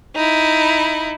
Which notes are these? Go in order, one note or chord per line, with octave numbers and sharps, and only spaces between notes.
D#4 E4